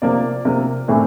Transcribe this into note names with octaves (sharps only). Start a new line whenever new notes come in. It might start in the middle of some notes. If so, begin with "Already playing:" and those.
C3 F3 A#3 D5
C3 F3 A#3 A#4
A2 E3 A3 C4 D4